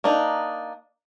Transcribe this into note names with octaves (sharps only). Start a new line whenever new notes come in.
A#3 D4 D#4